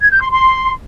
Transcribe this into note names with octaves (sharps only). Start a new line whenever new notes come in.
G#6
G6
C6
C6